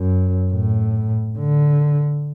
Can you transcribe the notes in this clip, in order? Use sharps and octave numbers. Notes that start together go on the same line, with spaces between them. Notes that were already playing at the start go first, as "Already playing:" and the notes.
Already playing: F#2
A2
D3